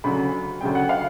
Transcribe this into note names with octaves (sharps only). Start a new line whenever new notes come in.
D2 C#3 F#3 B5
D2 C#3 F#3 G5
F#5
F5